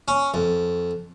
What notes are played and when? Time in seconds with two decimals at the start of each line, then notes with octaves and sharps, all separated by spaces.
0.08 C#4
0.34 F2